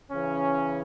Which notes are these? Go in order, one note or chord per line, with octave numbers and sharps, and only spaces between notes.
C#3 E3 C#4